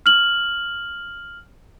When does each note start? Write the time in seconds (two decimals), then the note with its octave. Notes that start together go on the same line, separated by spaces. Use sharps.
0.06 F6 F#7